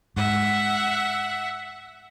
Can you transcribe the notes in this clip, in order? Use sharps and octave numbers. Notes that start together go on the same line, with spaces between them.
G#2 E5 F#5